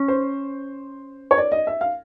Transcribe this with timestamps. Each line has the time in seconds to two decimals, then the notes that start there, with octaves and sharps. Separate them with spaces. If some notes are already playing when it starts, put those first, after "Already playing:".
Already playing: C#4
0.08 C5
1.31 C#5
1.37 D5
1.52 D#5
1.67 E5
1.81 F5